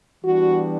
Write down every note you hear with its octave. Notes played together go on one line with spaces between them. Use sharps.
E3 G3 B3 D4 F#4